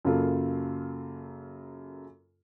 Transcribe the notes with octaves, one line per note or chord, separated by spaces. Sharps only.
F#2 C#3 A#3 F4 A4